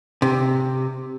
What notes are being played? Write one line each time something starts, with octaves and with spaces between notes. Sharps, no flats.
C3